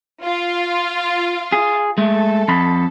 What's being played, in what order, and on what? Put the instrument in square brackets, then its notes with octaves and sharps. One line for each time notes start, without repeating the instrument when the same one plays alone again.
[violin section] F4
[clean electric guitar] G#4
[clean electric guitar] G#3 A3 [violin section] A4
[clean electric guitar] F2 B5